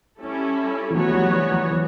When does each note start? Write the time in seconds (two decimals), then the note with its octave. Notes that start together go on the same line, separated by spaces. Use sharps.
0.19 G3 C#4 E4 A4
0.90 E3
0.95 F#3 B3 F#4 C#5
1.10 G3
1.14 F#3
1.26 F#3
1.33 E3
1.52 F#3
1.71 E3